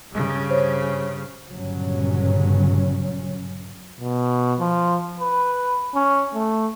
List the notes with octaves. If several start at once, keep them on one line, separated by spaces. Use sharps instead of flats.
G2 C#3
C5 C#5
G1 G2 A#2 C#3 F#3 C#4
B2
F3
B4
C#4
A3